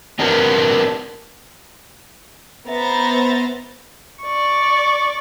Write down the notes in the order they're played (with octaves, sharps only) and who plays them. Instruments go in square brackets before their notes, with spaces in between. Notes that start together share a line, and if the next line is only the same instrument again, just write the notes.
[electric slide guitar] C4 D4 G4 A#4 B4 F#5
[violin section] B3 C5 E5 A#5 A6
[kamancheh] D5 C#6